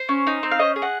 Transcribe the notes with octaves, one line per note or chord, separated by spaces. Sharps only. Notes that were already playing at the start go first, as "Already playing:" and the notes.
Already playing: C5
C#4
D#4
C4
F5
C#4 C5 D#5
G#4
D#5 F#5